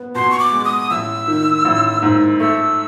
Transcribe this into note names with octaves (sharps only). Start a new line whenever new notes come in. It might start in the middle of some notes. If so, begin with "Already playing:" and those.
Already playing: B3
B2 C6
C#6
D6
G#3
D#6
A1 E6
D#3
A1
G#2
A3 E6